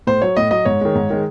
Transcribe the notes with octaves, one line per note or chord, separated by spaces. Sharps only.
A2 C5
F#3 C#5
A2 D#5
F#3 D#5
G#2 C#5
D#3 G#3
G#2
D#3 G#3